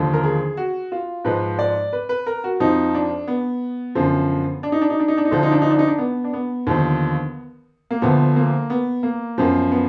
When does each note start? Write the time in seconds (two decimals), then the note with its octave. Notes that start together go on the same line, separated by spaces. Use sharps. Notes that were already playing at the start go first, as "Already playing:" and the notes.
Already playing: D#2 D3 F3
0.13 A#4
0.23 G#4
0.57 F#4
0.92 F4
1.24 G#2 F3 B4
1.59 D5
1.93 B4
2.09 B4
2.27 A#4
2.44 F#4
2.60 F2 F3 D#4
2.94 D4
3.28 B3
3.95 F#2 D3 F3
4.63 D4
4.72 D#4
4.81 D4
4.90 D#4
5.00 D4
5.08 D#4
5.17 D4
5.25 D#4
5.31 D2 D3 F3 D4
5.43 D#4
5.52 D4
5.62 D#4
5.70 D4
5.79 D#4
5.88 D4
5.98 B3
6.24 D4
6.33 B3
6.67 D#2 D3 F3
7.91 A#3
8.02 D2 D3 F3 B3
8.36 A#3
8.70 B3
9.03 A#3
9.38 F#2 F3 B3
9.72 B3